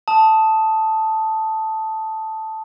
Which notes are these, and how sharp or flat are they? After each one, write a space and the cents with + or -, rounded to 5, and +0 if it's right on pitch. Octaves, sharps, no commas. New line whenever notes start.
A5 +0 D#6 +10